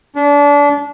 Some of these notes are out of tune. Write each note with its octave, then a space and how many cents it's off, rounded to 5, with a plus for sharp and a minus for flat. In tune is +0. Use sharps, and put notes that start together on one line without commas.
D4 -30